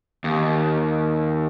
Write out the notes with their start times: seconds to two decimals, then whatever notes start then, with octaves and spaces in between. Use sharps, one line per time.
0.24 D#2